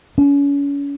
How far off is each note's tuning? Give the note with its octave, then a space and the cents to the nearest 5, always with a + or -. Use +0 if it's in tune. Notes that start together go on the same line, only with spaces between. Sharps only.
C#4 +35